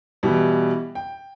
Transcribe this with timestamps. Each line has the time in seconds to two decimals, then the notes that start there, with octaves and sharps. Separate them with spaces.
0.23 B2 E3 G3
0.95 G5